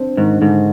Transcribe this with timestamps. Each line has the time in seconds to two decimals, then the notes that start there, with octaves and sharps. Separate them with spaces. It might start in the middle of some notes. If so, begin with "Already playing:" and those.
Already playing: C4 D4
0.17 G#2 D#3
0.42 G#2 D3